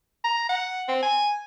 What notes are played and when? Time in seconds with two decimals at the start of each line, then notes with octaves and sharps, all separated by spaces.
0.24 A#5
0.49 F#5
0.88 C4
1.03 G#5